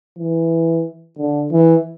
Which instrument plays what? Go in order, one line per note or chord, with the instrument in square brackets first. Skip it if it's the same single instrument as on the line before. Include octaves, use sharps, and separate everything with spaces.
[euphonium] E3
D3
E3